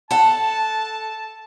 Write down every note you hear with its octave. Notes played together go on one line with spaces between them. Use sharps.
A4 F#5 A5